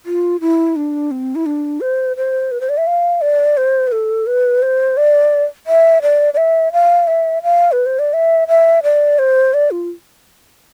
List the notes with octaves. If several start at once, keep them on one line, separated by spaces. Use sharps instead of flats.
F4
E4
D4
C4
E4
D4
C5
C5
B4
C5
D5
E5
F5
D5
C5
B4
A4
B4
C5
D5
E5
D5
D5
E5
F5
E5
F5
B4
C5
D5
E5
E5
D5
C5
D5
F4